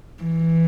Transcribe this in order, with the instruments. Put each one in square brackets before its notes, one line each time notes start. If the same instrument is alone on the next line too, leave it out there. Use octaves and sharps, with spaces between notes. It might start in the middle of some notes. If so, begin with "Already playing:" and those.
[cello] E3